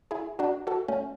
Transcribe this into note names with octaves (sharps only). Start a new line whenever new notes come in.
E4 G#4
D4 F#4
F#4 A4
A3 C#4